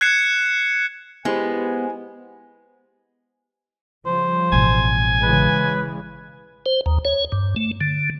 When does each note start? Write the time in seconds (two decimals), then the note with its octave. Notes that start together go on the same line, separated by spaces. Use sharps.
0.01 F#6 G#6 C7 C#7 E7
1.25 G#3 B3 E4 G4 B4 C5 G#5
4.06 C#3 F3 G3 C5
4.52 A1 B2 G#5
5.22 C#3 E3 G#3 B4
6.66 C5
6.86 D#2
7.05 C#5
7.32 G2
7.56 A3
7.81 D3